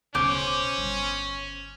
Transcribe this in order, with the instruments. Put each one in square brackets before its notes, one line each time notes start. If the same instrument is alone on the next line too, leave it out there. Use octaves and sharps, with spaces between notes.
[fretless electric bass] D1 B1 C#3 [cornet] C#4 [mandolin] C5 D6
[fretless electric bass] G1